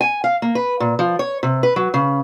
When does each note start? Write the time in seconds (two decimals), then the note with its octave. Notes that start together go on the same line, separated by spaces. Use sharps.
0.01 G#5
0.24 F5
0.42 A#3
0.55 B4
0.80 A#2
0.99 F3
1.19 C#5
1.43 C3
1.63 B4
1.76 F#3
1.94 C#3